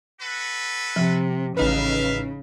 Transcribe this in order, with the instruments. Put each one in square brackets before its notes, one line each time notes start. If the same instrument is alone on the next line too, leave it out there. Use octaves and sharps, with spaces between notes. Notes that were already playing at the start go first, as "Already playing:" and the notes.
[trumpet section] F#4 A4 B4
[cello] C3 [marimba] F3
[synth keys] A1 D#4 B4 [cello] C#3 [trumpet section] E5 F5